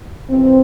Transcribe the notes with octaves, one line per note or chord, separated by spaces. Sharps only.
F2 C3 E3 C4